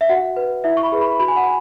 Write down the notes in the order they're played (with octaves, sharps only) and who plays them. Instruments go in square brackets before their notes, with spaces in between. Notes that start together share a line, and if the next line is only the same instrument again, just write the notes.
[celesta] E5
F#4 F#5
B4
E4 E5
C#6
B5
G#4 B4
B5
F#4 B5
G#5
F#5
G#5